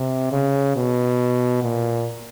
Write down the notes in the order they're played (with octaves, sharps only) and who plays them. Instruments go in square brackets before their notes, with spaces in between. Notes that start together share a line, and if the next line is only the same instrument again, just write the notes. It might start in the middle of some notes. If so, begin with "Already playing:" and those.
Already playing: [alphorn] C3
C#3
B2
A#2